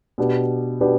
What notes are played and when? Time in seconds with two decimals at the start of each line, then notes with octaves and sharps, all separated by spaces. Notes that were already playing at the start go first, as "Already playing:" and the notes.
0.18 B2 B3 D4 G4 B4
0.81 B2 B3 D4 G4 B4